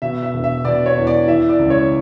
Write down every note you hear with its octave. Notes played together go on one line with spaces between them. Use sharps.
B2 E5
E5
E1
E5
B2 D5
C#5
E2
D5
E3 E5
D5
C#2
C#5